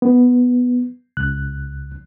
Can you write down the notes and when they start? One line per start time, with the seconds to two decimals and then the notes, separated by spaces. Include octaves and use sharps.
0.02 B3
1.17 C#2 F#6